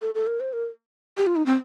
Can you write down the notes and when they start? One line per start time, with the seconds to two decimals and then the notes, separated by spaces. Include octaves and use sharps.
0.02 A4
0.15 A4
0.27 A#4
0.40 C5
0.53 A#4
1.17 G4
1.27 F4
1.36 D#4
1.46 C4